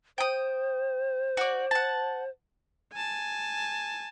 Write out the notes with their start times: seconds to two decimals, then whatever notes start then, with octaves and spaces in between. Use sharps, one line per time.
0.18 C5 G5 D#6
1.37 F#4 D5
1.71 F#5 A5
2.93 G#5 A5